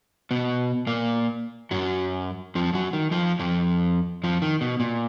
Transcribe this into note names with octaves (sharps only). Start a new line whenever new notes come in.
B2 B3
A#2 A#3
F#2 F#3
F2 F3
F#2 F#3
D#3
F2 F3
F2 F3
F2 F3
D#3
B2
A#2